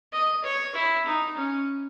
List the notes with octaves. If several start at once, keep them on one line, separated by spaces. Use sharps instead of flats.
D#5
C#5
E4
D#4
C#4